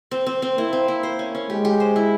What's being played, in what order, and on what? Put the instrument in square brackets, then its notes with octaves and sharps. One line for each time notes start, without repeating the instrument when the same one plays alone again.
[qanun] C4
C4
C4
[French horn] A#3 [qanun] E4
[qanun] C4
E4
C5
C#4
C#4
[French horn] G#3 [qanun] G4
[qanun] G4
C5
E4